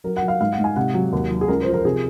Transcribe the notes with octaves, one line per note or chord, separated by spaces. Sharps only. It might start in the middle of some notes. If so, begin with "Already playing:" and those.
F#3 A#4
F#5
F#3
F5
G#2 F5
F#5
G#2
G#5
C3 F#5
F#3
D#2
F#3
G#4
C#2 A#4
F3 C5
A#4
C3 G#4